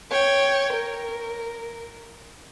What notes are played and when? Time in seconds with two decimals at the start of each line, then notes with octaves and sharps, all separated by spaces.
0.11 C#5 G5
0.73 A#4